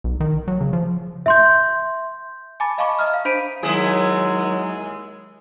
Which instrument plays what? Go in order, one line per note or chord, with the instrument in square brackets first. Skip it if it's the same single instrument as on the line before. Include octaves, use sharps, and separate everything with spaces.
[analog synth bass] B1
D#3
F#3
C#3
F3
[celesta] E5 C6 G6
G#5 A5 B5 D6 A6
D#5 F5 A5 B5 C#6 D6
D#5 E5 A#5 D#6 F6
F5
D4 C5 B5 B6 D7 D#7
[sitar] D#2 E4 G#4 [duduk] F#3 [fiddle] G#3